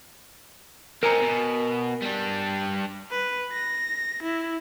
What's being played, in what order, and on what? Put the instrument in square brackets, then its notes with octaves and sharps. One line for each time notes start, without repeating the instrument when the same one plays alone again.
[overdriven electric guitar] C4 D#4 [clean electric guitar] A#4 G#5 A#5
[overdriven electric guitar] B2
G3 D4
[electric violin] B4
A#6
E4